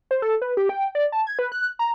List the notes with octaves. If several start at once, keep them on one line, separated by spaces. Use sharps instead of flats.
C5
A4
B4
G4
G5
D5
A5
G#6
B4
F#6
A#5